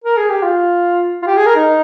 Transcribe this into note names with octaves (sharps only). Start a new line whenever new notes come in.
A#4
G#4
G4
F4
F4
G4
G#4
A#4
D#4